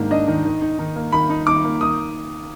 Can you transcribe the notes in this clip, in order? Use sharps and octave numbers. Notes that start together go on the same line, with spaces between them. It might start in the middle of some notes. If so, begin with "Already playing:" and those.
Already playing: G#2 D#3 A#3 D4
D4 D#5
D#3
D#3
D#4
D#3
A#3
D#3 B5
D#4
D#3 D6
A#3
D#3 D#6